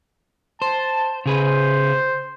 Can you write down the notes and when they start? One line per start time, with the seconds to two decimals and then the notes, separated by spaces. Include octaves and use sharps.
0.62 C5 A5
1.26 C#3 G#4 B4 C5